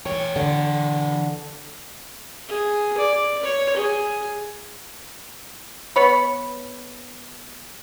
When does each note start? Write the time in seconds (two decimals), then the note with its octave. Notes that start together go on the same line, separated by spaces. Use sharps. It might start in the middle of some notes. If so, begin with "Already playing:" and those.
0.06 E3 C#5 G5
0.36 D3
2.48 G#4
2.98 D5
3.44 C#5
3.76 G#4
5.96 B3 C#5 B5